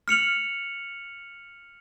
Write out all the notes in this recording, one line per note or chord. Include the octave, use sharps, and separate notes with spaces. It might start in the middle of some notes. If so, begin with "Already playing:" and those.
F6 C#7 F7 F#7